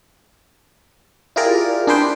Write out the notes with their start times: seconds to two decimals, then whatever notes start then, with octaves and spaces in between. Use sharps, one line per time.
1.36 E4 F4 G4 G#4 A#4 D5
1.87 D4 G#4 B4 C5 G5